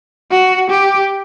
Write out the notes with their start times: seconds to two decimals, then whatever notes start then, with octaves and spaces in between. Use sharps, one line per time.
0.31 F#4
0.70 G4